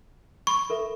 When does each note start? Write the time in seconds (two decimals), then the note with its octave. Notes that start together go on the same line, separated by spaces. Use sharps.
0.47 B5 C#6
0.70 A4 A#4 E5